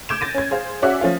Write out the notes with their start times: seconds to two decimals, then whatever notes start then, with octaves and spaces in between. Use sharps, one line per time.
0.09 D6 G6 G#6 D7 E7
0.21 A6 A#6 D#7
0.34 C#4 G#6
0.51 G#4 C5 F5
0.82 C#4 F#4 G#4 D5 E5 F#5
1.01 F3 A3 C#4 F4